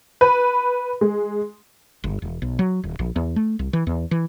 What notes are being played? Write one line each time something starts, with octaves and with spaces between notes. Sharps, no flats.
B4
G#3
G1
E1
B1
F#3
D#1
A#1
E2
A3
C2
E3
E2
E3